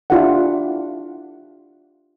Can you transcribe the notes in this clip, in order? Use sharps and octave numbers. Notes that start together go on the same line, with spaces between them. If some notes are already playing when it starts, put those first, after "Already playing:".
D4 E4 F4 G4 A4 F#5